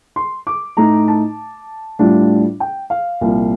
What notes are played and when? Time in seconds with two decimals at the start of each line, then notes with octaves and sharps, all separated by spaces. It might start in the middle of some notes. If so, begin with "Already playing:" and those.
0.16 C6
0.47 D6
0.77 A2 A3 D#4 A#5
1.08 A5
1.99 A2 G3 D4 F4
2.60 G5
2.90 F5
3.21 C2 A#2 F3